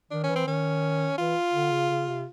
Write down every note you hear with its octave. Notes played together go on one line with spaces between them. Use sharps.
D#3 D4
C#4
E3
C4
D#3 C#4
E3 F4
D3
C#3
C#3
C3